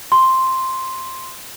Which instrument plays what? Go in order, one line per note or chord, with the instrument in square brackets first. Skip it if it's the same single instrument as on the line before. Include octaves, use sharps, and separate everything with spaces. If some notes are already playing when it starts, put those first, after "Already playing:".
[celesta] C6